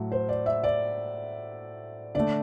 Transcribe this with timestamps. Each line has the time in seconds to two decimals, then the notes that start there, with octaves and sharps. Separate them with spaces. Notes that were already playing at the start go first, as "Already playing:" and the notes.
Already playing: A2 F#3 A3
0.12 C5
0.29 D5
0.46 E5
0.63 D5
2.15 D3 A3 D5